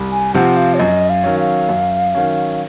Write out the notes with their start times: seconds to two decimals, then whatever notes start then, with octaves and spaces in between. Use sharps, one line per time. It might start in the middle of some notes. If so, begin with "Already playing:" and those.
Already playing: C2
0.12 G#5
0.34 C3 F3 C4 F#5
0.57 F5
0.74 C#5
0.79 F#2 D#5
1.10 F5
1.24 D#3 F#3 C#4
1.40 F5
1.69 F#2
2.15 D#3 F#3 C#4